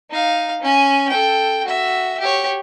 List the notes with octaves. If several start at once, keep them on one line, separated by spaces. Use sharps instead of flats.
D#4 F5
C#4 G#5
A4 G5
F#4 E5
G4 C#5